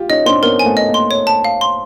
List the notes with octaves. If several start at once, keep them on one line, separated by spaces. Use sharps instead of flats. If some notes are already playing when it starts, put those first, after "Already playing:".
Already playing: F4 G4
C#4 D#4 D#5
C4 D4 C6
B3 C#4 A#4
G#5
A3 B3
D#5
A#3
C6
C#5
A5
F5
C6